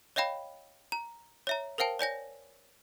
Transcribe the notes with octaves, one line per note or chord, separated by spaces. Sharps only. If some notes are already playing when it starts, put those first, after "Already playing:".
C#5 D#5 F5 G5 B5
A#5
C#5 E5 A#5
A#4 C5 F5 G5 A5
C#5 D5 G#5 A#6